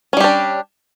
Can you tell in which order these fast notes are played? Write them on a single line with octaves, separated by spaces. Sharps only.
C#4 G3 G4 D4